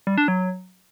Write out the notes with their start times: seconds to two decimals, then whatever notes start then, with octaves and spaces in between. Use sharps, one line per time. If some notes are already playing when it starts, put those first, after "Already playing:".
0.07 G3
0.18 D4
0.28 F#3